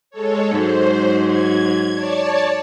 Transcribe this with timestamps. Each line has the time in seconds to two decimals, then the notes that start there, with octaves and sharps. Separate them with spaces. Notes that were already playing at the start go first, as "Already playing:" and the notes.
0.11 G#3 A4 C#5
0.51 G#2 F#3 C5
1.26 G#6
1.93 C#5 D5 A5